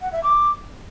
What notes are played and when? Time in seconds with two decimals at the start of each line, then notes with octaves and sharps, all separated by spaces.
0.01 F#5
0.12 E5
0.24 D6